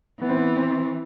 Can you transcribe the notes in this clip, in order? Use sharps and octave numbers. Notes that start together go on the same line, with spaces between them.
E3 B3
C4
B3
C4